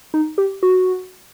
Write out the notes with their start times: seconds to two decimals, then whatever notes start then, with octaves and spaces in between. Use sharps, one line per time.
0.14 D#4
0.38 G4
0.63 F#4